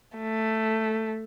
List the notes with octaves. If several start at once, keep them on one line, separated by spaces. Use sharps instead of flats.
A3